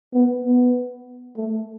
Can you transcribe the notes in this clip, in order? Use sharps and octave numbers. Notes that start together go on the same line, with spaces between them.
B3
B3
A3